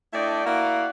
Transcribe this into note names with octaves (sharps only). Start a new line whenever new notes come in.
A3 D4 E4 D5 D#5 G5
A#3 E4 F#4 D5 F5 F#5